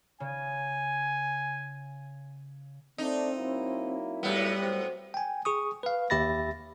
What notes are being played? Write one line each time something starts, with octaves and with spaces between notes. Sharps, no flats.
C#3 G#5
A3 C4 D4 D#4
F#3 A#3 E4
A2 G3 B3
F#3 C4
G5 G#5
G#4 C#6 D#6
B4 F5
D#2 G4 E5 B5 A6 A#6